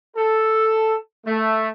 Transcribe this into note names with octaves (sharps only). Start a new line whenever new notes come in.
A4
A3